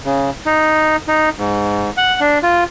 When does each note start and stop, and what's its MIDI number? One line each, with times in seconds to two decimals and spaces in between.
0.05 0.30 49
0.46 0.96 63
1.08 1.29 63
1.38 1.90 44
1.97 2.20 78
2.20 2.39 62
2.43 2.64 65